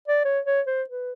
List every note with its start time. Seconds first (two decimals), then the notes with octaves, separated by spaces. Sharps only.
0.08 D5
0.24 C#5
0.46 C#5
0.67 C5
0.89 B4